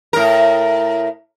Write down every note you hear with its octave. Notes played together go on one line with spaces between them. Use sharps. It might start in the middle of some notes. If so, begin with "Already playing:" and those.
A2 A#4